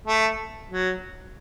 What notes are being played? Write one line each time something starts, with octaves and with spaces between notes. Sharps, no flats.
A3
F#3